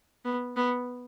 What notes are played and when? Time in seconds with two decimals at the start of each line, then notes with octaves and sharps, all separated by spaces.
0.25 B3
0.57 B3